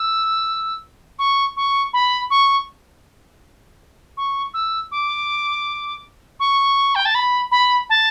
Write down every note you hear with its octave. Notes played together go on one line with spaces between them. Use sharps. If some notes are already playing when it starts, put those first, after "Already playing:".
Already playing: E6
C#6
C#6
B5
C#6
C#6
E6
D6
C#6
G5
A5
B5
B5
A5